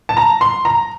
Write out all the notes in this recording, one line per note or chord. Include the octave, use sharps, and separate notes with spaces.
A5
A#5
C6
A#5